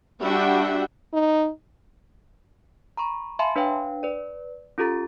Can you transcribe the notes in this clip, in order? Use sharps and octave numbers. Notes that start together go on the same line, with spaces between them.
G3 D4 F#4 E5 F#5 G5
D#4
A#5 B5 C#6
E5 F5 G#5 A5 B5 C6
D4 B4 C#5 F5 G5
B4 D5
C#4 F4 G4 A4 A#5 A6